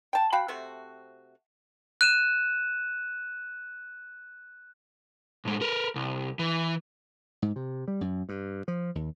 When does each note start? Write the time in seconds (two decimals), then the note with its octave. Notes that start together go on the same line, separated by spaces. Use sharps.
0.13 G5 A5
0.32 F#4 F5 G5 B5
0.48 C3 A3 C4 F#4
2.01 F#6 D#7 E7
5.45 A2 G#3
5.61 A#4 B4
5.95 C2
6.39 E3
7.42 G#2
7.56 C3
7.88 G3
8.01 F#2
8.29 G2
8.68 F3
8.95 D#2